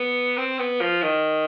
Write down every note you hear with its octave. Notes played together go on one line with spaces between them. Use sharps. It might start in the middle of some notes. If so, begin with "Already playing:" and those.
Already playing: B3
C4
B3
F3
D#3